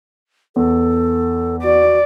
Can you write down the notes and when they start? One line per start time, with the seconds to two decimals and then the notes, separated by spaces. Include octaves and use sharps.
0.56 E2 A4
1.63 F#4 D5